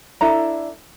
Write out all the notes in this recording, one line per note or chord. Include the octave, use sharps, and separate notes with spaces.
D4 E4 A4 A#5